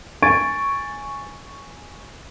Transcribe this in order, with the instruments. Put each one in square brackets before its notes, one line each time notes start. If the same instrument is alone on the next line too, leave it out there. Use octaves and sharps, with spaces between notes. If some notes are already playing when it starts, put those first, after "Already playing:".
[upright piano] G#5 C#6 G#6 A6 D7